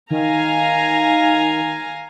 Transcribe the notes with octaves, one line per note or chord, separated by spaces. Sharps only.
D#3 F5 G#5 A#5